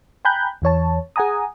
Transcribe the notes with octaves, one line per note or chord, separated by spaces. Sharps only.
G5 G#5 A#5 B5 F#6 G6
E2 E3 C#5 A5
G#4 F#5 G#5 A#5 D#6